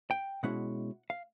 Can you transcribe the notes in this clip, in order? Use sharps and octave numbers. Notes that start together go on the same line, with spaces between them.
G5
B2 G#3 C#4 E4 F#5
F5